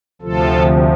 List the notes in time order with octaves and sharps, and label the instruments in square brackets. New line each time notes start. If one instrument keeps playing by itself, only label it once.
[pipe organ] D2 C3 F3 F4 A4